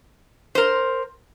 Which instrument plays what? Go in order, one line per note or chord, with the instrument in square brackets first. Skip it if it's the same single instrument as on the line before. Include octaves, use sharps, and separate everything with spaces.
[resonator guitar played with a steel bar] A#4 C5